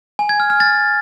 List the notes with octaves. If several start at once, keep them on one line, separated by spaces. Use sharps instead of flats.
G#5
G#6
F6
F6
A6